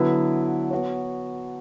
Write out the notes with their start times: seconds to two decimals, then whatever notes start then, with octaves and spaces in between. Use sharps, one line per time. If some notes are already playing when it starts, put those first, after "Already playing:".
Already playing: D3 F#3 B3 E4 B4
0.71 B3 F#4 C#5